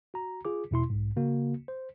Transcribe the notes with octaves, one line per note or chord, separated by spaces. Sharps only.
F#4 A#5
F4 G#4 D6
E2 B2 E4 C6
B1 G#2
C#3 A#3 F#4
C5